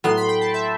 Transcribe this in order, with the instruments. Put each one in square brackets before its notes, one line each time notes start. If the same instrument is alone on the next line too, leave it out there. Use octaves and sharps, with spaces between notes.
[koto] A2 F#3 B3 [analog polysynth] C6
[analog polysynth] B5
G5
A5
E5